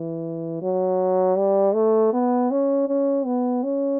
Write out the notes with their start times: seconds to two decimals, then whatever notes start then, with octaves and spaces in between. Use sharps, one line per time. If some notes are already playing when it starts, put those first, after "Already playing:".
Already playing: E3
0.62 F#3
1.38 G3
1.75 A3
2.13 B3
2.51 C#4
2.88 C#4
3.26 B3
3.64 C#4